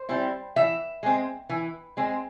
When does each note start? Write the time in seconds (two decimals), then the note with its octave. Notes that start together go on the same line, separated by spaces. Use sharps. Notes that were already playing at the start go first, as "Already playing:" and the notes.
Already playing: C5
0.09 G3 C4 E4
0.56 E3 E5
1.03 G#3 C4
1.49 E3
1.97 G#3 C4